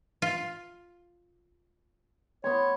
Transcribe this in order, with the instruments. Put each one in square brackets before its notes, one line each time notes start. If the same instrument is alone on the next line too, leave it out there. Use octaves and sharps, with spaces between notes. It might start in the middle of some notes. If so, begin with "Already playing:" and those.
[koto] F4
[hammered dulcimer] B3 C6 [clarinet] C#5